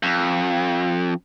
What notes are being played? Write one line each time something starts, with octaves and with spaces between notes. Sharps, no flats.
F2